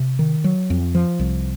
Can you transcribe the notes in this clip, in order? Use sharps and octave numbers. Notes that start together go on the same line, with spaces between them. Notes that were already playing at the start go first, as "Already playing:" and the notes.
Already playing: C3
D#3
F#3
F2
F3
C2